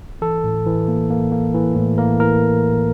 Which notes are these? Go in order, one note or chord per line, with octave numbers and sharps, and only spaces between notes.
E3 A4
A2
E3
A#3
A#3
A#3
E3
A2
A#3 A#4
E3 A#4